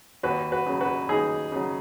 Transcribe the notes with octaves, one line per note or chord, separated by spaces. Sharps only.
D#2 F#4 B4
F#4 B4
C#3 F#3
F#4 B4
D#2 D#4 G#4
C#3 F#3